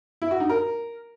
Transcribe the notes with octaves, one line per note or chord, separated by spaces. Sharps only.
E4
F#4
D#4
A#4